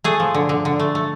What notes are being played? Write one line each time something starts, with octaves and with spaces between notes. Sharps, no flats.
A3 G#4
F3
D3
D3
D3
A3
A3